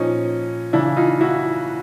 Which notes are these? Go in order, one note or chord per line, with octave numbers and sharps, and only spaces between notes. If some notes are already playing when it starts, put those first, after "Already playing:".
Already playing: A#2 F3 C#4 D#4
C#3 E3 D4 E4
D#4 F4
E4 F#4